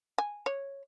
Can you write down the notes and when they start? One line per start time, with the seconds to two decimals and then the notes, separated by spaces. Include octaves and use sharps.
0.18 G#5
0.46 C#5